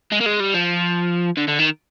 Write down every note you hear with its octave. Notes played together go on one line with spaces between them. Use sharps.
G#3
A#3
G#3
G3
F3
D3
D3
D#3